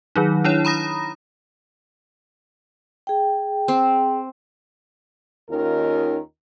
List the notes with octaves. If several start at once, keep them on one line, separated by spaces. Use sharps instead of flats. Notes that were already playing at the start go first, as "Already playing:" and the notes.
D#3 F#3 D#4
D4 E4 C#5
A#5 B5 D#6 A#6
G#4 G5
C4
D#2 D#3 C#4 D#4 F4 A#4